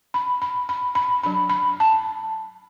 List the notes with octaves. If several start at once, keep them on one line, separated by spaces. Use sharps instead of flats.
B5
B5
B5
B5
F#3 D4 B5
B5
A5